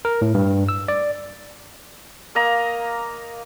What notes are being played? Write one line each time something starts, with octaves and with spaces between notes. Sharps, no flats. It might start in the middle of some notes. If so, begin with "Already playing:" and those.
A#4
A2
G2
E6
D5
A#3 D#5 A#5